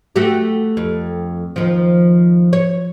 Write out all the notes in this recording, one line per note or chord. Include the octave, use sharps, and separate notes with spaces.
A3 F#4 G4
F2
D#2 F3
C#5